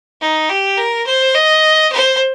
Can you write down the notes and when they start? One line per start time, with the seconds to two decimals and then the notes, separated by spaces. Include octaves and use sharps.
0.21 D#4
0.50 G4
0.78 A#4
1.06 C5
1.35 D#5
1.92 C5